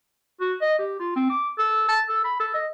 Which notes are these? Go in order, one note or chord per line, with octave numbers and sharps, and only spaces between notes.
F#4
D#5
G4
F4
C4
D6
A4
A5
A4
B5
A4
D#5